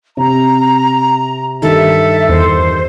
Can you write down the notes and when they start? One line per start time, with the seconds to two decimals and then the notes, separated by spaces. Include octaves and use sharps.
0.17 C3 A#5
1.62 G2 D#3 A4 E5
2.29 E2 C5